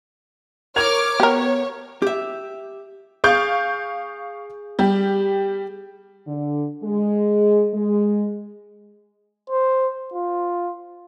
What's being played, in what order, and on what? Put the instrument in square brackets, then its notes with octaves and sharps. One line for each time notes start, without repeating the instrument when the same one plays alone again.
[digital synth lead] A#4 [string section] C#5 D6 F6 [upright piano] G#6 F7
[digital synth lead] B3 [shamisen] G4 A#4 [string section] C#5
[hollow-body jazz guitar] G4 E5
[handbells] G#4 [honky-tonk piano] F5 C#6 G6
[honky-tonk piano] G3 G4
[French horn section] D3
G#3
G#3
[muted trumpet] C5
F4